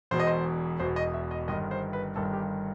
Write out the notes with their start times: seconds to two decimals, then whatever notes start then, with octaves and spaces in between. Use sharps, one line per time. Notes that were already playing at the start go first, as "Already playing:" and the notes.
0.11 E1 E2 B2 C5
0.20 D#5
0.27 C5
0.79 E1 E2 B2 C5
0.96 D#5
1.14 E5
1.31 D#5
1.48 G1 G2 D#3 D#5
1.71 C5
1.93 B4
2.16 G1 G2 D#3 A4
2.33 G4